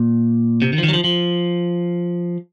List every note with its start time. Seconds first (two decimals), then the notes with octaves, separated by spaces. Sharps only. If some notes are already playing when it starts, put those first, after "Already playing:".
Already playing: A#2
0.62 C3
0.73 D#3
0.78 F3
0.83 D#3
0.88 F#3
0.93 F3
1.04 F3